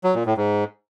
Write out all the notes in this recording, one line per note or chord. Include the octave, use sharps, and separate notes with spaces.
F#3
A#2
A2
G#2